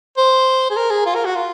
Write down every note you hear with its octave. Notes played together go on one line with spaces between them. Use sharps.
C5
G#4
A#4
G#4
F4
A#4
F#4
F4